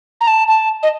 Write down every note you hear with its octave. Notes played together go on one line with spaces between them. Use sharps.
A#5
A5
A5
D#5